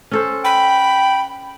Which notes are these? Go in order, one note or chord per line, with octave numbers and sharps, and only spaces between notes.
C#4 A4 C5
G5 B5